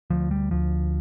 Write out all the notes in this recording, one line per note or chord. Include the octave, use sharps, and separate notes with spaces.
D2 F3
G3
D2 F3